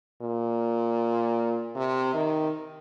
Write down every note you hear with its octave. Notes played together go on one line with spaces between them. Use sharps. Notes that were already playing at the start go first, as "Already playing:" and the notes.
A#2
C3
D#3